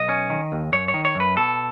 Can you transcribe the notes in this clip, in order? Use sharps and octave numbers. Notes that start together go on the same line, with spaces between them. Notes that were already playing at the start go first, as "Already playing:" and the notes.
Already playing: B1 D#5
C#4
D#3
D#2
F#2 C#5
C#5
D#3
C#5
F#2 B4
B2 A4